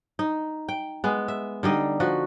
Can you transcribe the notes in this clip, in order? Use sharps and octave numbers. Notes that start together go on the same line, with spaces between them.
D#4
G5
G#3 B3
E5
D3 G3 D#4 D#5
F3 F#4